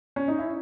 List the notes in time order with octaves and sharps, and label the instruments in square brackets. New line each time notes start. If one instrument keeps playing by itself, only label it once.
[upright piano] C#4
D#4
E4